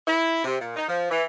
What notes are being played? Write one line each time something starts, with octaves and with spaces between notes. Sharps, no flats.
E4
C3
A#2
D#4
F3
E3